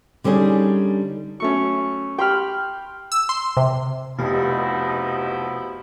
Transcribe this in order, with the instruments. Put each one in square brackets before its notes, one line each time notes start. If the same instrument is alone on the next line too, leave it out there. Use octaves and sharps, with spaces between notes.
[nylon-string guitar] D3 G3 C#4 D#4 G#4
[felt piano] F#3 A3 C#4 [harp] C#6
[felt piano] G4 C6 [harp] G5 B5 F6
[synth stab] E6
C6
C3
[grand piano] F1 [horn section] B2 F3 E4 [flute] D#4 [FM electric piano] G4 A5